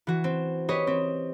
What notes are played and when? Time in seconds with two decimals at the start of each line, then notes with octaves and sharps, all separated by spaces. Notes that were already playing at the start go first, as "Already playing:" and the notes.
0.07 E3 F#4
0.24 C4
0.69 G4 B4 C#5 D#5
0.87 C4